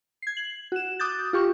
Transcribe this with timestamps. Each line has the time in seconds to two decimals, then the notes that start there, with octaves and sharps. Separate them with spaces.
0.22 G#6 C7
0.37 F#7
0.72 F#4 E7
0.99 D6 D#6 F#6 G6 A6
1.33 F4 G4 C#6